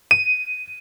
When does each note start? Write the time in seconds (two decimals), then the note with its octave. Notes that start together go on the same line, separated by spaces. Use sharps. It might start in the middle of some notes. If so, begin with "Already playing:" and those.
0.11 D#7